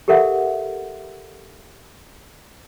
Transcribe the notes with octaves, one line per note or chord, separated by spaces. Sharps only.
G4 A4 A#4 E5 F#5